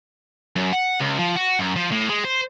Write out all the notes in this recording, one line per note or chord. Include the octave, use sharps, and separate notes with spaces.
F#2
F#5
C#2
F3
F#4
F#2
F3
A2
G#3
C5